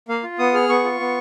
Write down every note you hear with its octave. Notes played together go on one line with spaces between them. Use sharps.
A#3 F5
F4
B3 D#6
G#4 F6
B3 C#6
F4
B3